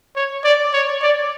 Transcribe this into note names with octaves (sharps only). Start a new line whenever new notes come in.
C#5
D5
C#5
D5